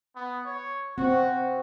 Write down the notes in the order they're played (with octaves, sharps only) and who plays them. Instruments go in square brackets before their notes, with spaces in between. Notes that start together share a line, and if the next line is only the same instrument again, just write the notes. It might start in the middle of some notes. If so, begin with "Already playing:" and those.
[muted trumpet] B3
C#5
[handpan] C4 [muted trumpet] F#4